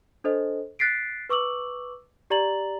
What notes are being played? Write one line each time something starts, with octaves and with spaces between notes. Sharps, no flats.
D4 A4 C5 D#5
F#6 A6 B6 C7 D7
B4 C#6 D6 E6 F#7
G4 D5 A#5 A6 F#7